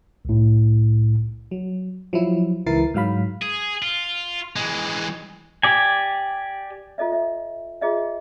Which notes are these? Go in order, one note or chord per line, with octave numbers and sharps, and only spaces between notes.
C2 A2
F#3
F3 F#3 E4
C#2 E3 E4 A#4 A6 C7
G#2 F#3 F5 B5
G#4
F4
E3 G#3
G4 D5 G#5
F4 A4 D#5 E5
E5
F4 G#4 D#5 E5